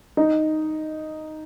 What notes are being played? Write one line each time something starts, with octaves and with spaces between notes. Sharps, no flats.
D#4